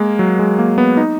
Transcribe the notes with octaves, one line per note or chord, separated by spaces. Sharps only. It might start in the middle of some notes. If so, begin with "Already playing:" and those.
Already playing: G#3 A#3
F#3
G#3
A#3
B3
D#4